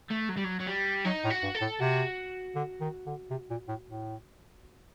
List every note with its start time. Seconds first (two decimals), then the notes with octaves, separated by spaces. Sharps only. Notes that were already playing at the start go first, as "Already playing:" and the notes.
0.11 A3
0.29 F#3
0.37 G3
0.44 F#3
0.60 F#3
0.67 G3
1.05 F#3 D#4
1.24 A2
1.30 F#4
1.43 G2
1.55 A4
1.61 A2
1.80 C3 F#4
2.55 D3
2.81 D#3
3.06 D3
3.30 C3
3.50 A#2
3.68 A2
3.87 A2